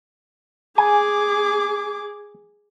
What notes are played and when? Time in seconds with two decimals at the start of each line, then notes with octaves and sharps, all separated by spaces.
0.78 G#4 G#5 D6